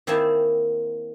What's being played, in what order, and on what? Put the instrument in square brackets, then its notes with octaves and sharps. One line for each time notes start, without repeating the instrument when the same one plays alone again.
[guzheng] D#3 A#3 C4 E4 G#5 A5